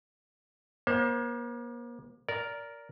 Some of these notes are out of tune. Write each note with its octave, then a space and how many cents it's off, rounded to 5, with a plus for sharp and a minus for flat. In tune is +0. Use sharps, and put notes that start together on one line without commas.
A#3 +40 C5 +25
A#4 +0 D5 -20